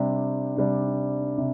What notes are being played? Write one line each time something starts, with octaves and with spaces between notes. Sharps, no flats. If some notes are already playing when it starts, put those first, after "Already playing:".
Already playing: C3 G3 D4
C3 G3 D4
C3